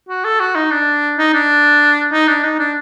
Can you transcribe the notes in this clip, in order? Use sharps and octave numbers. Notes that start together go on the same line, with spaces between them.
F#4
A4
F#4
D#4
D4
D#4
D4
D#4
D4
D#4
D4